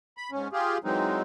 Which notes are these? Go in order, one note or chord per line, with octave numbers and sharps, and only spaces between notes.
B5
G#2 C#4
F4 G4 G#4
E3 F#3 G#3 C4 D#4